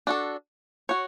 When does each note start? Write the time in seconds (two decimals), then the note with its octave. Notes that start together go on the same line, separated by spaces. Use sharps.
0.07 D4 F#4 A4
0.89 F#4 C#5